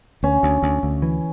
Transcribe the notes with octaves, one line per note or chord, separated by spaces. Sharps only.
D2 C#4
D2
D2
D2
E3